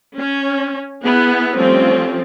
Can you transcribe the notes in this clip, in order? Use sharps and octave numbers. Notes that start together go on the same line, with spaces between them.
C#4
B3 E4 G#4
F3 G3 A3 C4 C#4 F4